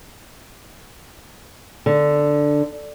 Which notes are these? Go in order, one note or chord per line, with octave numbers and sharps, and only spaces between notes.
D3